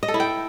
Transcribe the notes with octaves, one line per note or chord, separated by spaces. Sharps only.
D#5
A4
E4
G5